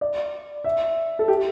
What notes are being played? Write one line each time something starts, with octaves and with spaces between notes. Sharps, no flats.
D5
E5
A4
G4